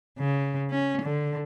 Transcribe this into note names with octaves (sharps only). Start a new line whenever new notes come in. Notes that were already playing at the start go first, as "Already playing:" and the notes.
C#3
C#4
D3